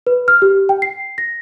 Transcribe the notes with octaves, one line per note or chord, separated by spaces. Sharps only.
B4
F6
G4
G5
C7
A#6